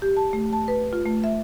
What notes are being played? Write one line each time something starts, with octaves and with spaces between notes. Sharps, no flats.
G4
A5
A3
A5
B4
F4
A3
E5